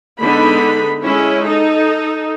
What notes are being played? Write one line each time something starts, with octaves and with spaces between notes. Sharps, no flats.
D3 G#3 B3 D#4 B5
G#3 C#4 E4
D#4 A4